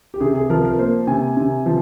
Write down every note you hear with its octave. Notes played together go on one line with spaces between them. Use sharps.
G4
C3 G#4
G#4
F3 A#4
A#4
A#3 C5
C3 G#5
C3
F3